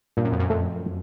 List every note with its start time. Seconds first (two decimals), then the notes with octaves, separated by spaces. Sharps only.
0.17 G2 A#2
0.24 F#2
0.32 F2
0.39 F#2
0.50 F2 A3